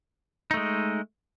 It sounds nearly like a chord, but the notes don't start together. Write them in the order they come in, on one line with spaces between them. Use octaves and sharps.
D#4 A3 G#3